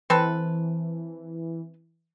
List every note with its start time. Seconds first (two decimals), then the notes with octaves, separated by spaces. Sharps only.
0.10 E3 C4 A4 B4